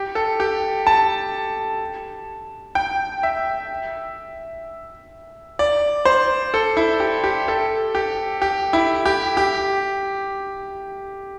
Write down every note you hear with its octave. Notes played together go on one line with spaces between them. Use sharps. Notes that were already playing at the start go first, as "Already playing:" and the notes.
Already playing: G4
A4
G4
A5
G5
E5
D5
C5
A4
E4
G4
G4
A4
G4
G4
E4
G4
G4